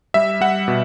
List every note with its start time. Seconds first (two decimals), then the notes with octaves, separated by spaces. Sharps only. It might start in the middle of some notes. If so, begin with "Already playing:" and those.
0.14 G3 E5
0.41 G3 F#5
0.68 B2